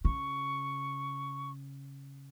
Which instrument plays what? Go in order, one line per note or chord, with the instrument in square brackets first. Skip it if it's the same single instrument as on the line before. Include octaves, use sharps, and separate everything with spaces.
[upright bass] C#3 [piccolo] C#6